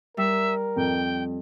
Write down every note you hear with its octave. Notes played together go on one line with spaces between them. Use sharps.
G3 A#4 E5
F2 G5